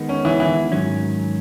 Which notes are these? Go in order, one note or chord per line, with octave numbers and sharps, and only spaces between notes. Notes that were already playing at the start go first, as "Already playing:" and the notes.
Already playing: D#3 G#3 B3
C#4
E3
E3
G#2 D#3 F#3 C#4